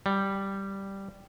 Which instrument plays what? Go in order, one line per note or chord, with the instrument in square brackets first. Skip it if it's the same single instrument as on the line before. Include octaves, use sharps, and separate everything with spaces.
[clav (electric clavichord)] G3